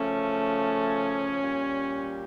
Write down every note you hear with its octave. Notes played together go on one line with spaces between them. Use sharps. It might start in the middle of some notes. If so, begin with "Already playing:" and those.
Already playing: C#3 F3 A3 C#4
A#2 G3